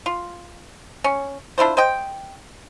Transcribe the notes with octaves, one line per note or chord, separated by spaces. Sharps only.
F4
C#4
D4 E4 F4 C5
C5 D#5 G5